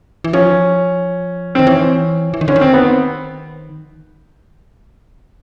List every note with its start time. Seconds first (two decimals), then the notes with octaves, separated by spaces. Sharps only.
0.24 E3
0.33 F3 C#4
1.55 D#3 C4
1.66 E3 C#4
2.34 E3
2.41 D#3
2.48 D3 C#4
2.56 D#3
2.61 C4
2.74 B3